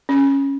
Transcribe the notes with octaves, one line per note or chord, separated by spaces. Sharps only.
C#4